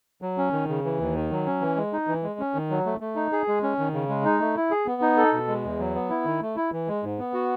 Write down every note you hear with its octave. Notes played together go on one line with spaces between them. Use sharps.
F#3
C#4
D#3
C#3
E3
D#2
D#3
F#3
C#4
E3
G#3
D#4
E3
G#3
C#4
D#3
F#3
A3
A3
D#4
G#4
G#3
C#4
D#3
C#3
G#3
D#4
A3
E4
G#4
B3
D#4
A4
B2
G#3
E2
F#3
B3
E4
D#3
A3
E4
E3
G#3
G#2
B3
F#4